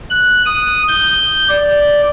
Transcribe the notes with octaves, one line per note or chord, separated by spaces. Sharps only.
F#6
D#6
G6
D5